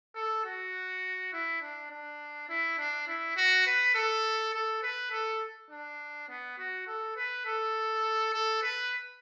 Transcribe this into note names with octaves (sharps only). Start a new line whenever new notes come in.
A4
F#4
E4
D4
D4
E4
D4
E4
F#4
B4
A4
A4
B4
A4
D4
B3
F#4
A4
B4
A4
A4
B4